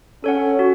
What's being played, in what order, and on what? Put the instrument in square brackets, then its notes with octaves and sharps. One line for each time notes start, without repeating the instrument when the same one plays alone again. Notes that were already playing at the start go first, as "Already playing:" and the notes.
[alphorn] C#4 [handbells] A4 C#5 F#5
[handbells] F#4